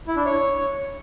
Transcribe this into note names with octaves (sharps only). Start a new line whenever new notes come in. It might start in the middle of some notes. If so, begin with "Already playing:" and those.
E4
D4
C#5